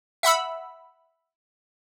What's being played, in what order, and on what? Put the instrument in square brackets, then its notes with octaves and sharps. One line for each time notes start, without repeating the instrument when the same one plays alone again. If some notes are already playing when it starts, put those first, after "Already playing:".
[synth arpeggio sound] E5 F#5 B5 E6